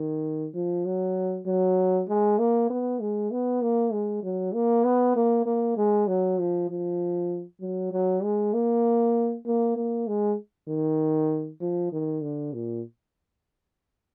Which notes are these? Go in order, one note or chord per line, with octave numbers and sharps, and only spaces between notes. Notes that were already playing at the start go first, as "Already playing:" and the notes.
Already playing: D#3
F3
F#3
F#3
G#3
A#3
B3
G#3
B3
A#3
G#3
F#3
A#3
B3
A#3
A#3
G#3
F#3
F3
F3
F#3
F#3
G#3
A#3
A#3
A#3
G#3
D#3
F3
D#3
D3
A#2